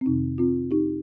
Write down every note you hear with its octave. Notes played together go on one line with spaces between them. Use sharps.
C4
F2 C3 D#3 D#4
C4 F4
D#4 G4